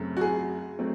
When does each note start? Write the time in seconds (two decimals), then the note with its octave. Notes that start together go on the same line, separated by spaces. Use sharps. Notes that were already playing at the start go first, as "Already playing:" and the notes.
Already playing: F#2 C#3 F#3 A3 C4
0.17 F#4
0.21 G#4
0.79 F#3 A3 C4